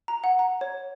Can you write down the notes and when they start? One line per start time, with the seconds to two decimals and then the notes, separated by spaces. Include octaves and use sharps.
0.08 A#5
0.24 F#5
0.39 A#5
0.61 C#5